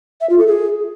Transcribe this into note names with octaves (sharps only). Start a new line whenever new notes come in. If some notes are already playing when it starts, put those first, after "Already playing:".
E5
F4
A4
G#4